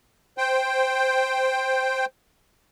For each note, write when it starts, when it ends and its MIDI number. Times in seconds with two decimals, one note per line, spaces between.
0.38 2.05 72
0.38 2.05 79